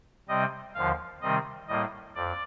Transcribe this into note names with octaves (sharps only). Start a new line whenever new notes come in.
C3 G3 C4 D#5
D#2 D3 F3 F5
C3 D#3 G3 C4 D#5
A2 G3 A#3 D#5
F2 D5